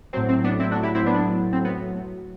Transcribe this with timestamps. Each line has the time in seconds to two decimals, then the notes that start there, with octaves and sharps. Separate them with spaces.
0.13 A2 F#3 C4
0.29 C4
0.44 B3 D4
0.60 C4 E4
0.71 D4 F#4
0.83 E4 G4
0.95 C4 E4
1.06 B3 D4
1.53 C4
1.65 B3